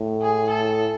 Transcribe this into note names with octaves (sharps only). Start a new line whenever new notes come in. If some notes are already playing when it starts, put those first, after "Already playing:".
Already playing: A2
G#4
A4